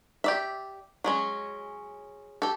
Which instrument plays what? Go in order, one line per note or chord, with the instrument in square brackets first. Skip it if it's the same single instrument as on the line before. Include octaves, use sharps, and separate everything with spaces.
[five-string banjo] G4 D5 E5
F#3 G#3 C#4
G4 A4